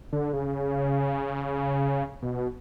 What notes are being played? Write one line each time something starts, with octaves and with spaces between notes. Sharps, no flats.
D3
C#3
B2